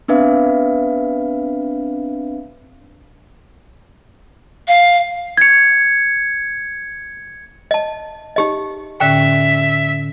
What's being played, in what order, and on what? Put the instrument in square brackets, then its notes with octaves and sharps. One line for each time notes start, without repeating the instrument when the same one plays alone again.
[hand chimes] B3 C4 D4 B4 E5 F5
[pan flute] F5
[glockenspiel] G#6 C#7
[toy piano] D#5 A5
D#4 G4 D#5
[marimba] A2 D3 C#4 [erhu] E5 [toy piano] G5